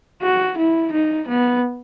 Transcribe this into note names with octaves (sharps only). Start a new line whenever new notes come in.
F#4
E4
D#4
B3